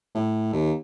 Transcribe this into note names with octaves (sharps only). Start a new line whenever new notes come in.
A2
D#2